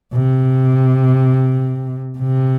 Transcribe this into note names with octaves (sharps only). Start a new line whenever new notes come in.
C3
C3